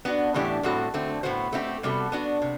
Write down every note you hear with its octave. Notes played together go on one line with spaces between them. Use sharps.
B3 D4 F#4
A2 E3 A3 D4 G4
A2 G3 C4 F#4 A4
D3 A3 C4
A2 E3 B3 F#4 C5
A3 C4 E4 G4
C3 G3 B3 F#4 A4
B3 D4 F#4
C3